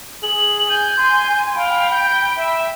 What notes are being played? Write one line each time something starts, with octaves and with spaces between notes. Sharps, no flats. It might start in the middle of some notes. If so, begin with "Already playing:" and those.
G#4 F#7
G#5 G6
C6
F5 G5 B5
G6
E5